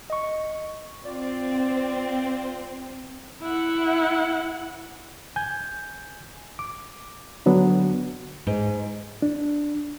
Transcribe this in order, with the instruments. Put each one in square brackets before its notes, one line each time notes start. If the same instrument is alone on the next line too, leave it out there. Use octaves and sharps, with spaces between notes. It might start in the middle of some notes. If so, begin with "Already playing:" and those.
[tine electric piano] D#5 C#6
[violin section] C4 [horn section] F4 D5
[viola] E4 F#5
[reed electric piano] G#5 G6
D6
D3 F#3 B3 D4
[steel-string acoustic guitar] G#2
[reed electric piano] D4